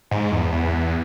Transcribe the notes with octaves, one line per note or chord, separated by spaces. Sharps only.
G#2
E2
E2